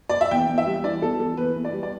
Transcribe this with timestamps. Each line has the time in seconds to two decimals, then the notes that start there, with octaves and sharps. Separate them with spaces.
0.09 D5
0.21 E5
0.31 E2 G5
0.49 E2
0.58 E5
0.67 G3
0.84 E3 D5
1.02 E2 A4
1.20 E2 A4
1.37 E2 B4
1.55 E2
1.65 D5
1.73 G3
1.83 D5